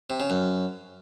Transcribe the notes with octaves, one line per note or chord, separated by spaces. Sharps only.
C3
C#3
F#2